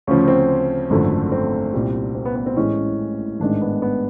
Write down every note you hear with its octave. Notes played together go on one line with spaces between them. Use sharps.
D2 C#3 F3 C#4
C4
G#1 F#2 D3 F3 A3
C4
C2 A#2 G3
C4
B3
B3
C4
A1 A2 E3 G#3 C#4
A1 G#2 D#3 G#3 D4
B3
B3